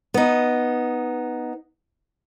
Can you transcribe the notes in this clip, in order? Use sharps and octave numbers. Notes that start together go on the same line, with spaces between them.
B3 D#4